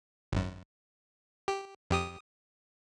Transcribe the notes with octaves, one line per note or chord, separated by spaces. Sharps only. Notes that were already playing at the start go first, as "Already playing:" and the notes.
G#1 F#2
G4
F2 G4 D#6